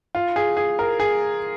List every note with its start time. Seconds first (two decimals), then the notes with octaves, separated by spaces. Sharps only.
0.15 F4
0.36 G#4
0.57 G#4
0.79 A#4
1.00 G#4